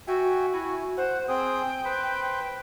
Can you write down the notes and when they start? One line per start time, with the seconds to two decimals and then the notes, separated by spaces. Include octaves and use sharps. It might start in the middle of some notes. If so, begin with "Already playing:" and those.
0.07 F#4 E5 G5 G#5
0.53 E4 G#5
0.97 C5 F#5
1.28 C4 G#4 G5 D#6
1.85 B4 C5 B5